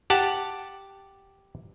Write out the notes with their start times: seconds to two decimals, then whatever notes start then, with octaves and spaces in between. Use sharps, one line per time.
0.10 G4 F#5 A5